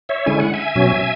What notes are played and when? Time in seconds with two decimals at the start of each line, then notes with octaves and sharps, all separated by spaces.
0.09 C#5 E5
0.26 D3 G#3 C#4 E4 G#5
0.40 F#5
0.54 E5 G#5
0.75 B2 F#3 C#4